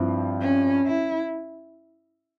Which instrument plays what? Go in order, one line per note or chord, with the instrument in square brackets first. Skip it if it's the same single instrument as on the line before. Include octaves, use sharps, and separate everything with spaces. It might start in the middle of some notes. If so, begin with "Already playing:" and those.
Already playing: [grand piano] G2 F3 C4 E4
[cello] C#4
E4